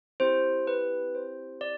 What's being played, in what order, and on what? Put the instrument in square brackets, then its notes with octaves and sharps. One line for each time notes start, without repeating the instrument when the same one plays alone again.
[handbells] C4 E4 G4 C5
B4
C5
D5